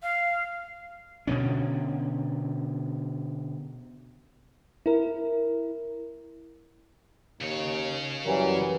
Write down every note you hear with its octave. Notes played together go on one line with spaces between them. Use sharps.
F5
B2 D3 C#4
E4 A#4
D#2 C#3 C#5
F#2 E3 G3 A#4